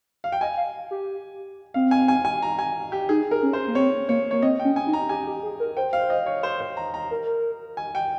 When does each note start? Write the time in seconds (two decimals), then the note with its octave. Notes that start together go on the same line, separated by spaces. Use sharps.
0.24 F5
0.32 G5
0.41 D#5 G#5
0.57 F5
0.91 G4
1.74 C4 F5
1.91 G#5
2.08 G#5
2.25 G#5
2.42 A#5
2.59 G#5
2.92 G4
3.09 D#4 G#4
3.31 A#4
3.43 C#4
3.53 C5
3.67 A#3
3.75 C4 C#5
4.09 A#3 C#5
4.31 A#3 C#5
4.43 C4 D#5
4.59 G5
4.64 C#4
4.76 G#5
4.87 D#4
4.93 A#5
5.09 G4 G#5
5.27 G4
5.43 G#4
5.60 A#4
5.77 C5 G5
5.93 F5
6.10 D#5
6.26 C#5
6.43 C5
6.61 C5
6.77 A#5
6.94 A#5
7.11 A#4
7.77 G#5
7.95 G5